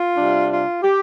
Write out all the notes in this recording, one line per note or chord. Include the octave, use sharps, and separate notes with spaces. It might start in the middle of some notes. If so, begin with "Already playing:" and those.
Already playing: F4
C3 G3 D4
F4
G4